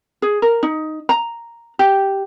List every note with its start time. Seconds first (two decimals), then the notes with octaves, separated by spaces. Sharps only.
0.22 G#4
0.42 A#4
0.63 D#4
1.09 A#5
1.79 G4